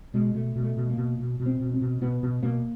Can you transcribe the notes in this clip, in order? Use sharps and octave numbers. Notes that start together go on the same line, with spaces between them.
B2 G#3
B2 A3
B2
A3
B2
A#3
B2
B2
B2
C4
B2
C4
B2
B2 B3
B2
B2 A#3